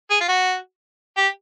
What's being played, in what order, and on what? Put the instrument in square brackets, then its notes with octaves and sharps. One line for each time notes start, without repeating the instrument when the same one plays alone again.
[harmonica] G#4
F4
F#4
G4